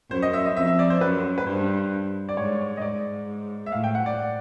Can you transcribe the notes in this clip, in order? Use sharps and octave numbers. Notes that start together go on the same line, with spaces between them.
F#2 C5
D#5
E5
D#5
F2 E5
E5
D5
C5
F#2 B4
B4
G2 C5
D5
G#2 C#5
D#5
G#2 D5
E5
A2 F5
G5
F#5
D5